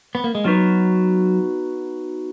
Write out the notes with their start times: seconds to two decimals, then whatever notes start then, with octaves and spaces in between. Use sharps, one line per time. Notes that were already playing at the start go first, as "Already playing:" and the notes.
0.15 B3
0.24 A#3
0.35 G#3
0.44 F#3 B3 D#4 F#4 B4